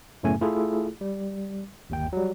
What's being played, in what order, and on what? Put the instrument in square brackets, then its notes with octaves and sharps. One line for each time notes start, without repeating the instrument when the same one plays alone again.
[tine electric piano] F#2 A2 C#3 A3 B3 G#5
A3 E4 F4 G#4 A4
G3
G1 D#2 G5
F#3 G3